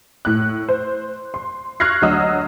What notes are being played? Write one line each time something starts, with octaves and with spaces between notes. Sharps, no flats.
A2 F#6
C5
C6
C#6 F6 F#6 G#6 A#6 C7
D2 F#3 D#5 E6